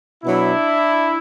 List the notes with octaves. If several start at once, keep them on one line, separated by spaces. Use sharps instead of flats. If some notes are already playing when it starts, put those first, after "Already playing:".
B2 F#3 D4 E4